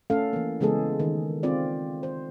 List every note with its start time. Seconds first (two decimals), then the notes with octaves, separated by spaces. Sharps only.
0.10 A3 C#4 A4 F5
0.33 E3 A#3
0.61 C#3 E3 G#3 B3 G#4 A4
1.00 D#3
1.43 C4 F4 D5
2.03 C5